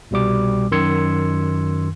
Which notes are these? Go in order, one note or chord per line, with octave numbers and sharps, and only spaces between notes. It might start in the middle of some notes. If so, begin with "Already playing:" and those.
C2 B2 G3 D6
F#2 D#3 C6 E6 G#6 C#7